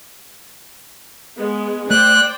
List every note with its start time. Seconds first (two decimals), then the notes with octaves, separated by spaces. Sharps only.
1.38 G#3 B3
1.91 A3 C5 D5 G5 F#6